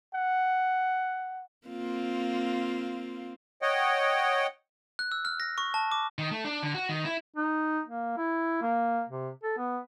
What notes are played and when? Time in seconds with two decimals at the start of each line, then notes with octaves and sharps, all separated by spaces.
0.14 F#5
1.67 A#3 C4 F4
3.62 C#5 D#5 F#5 G5
4.99 F#6
5.12 E6
5.25 F6
5.40 A#6
5.58 C#6
5.74 A5
5.92 D6
6.18 D#3
6.31 A3
6.45 D4
6.63 D3
6.75 F#4
6.89 D#3
7.05 E4
7.37 D#4
7.86 A#3
8.17 E4
8.62 A#3
9.09 C3
9.43 A4
9.58 B3